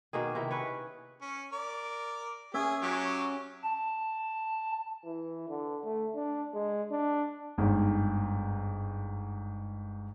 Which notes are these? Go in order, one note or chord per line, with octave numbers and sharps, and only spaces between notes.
B2 D#3 A#3 G#4
C3 D#3 E4
C#4 B4 C#5
C#4
A#4 D5
C#4 G#4 E5 G#5
F#3 G4
A5
E3
D3
A3
D4
G#3
D4
G1 G#2